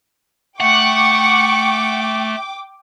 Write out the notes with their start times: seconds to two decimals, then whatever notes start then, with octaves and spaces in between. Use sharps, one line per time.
0.60 A3 F#5 G5 C#6 D6